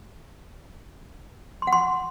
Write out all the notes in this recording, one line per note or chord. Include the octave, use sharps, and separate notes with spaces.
C6
F#5
C6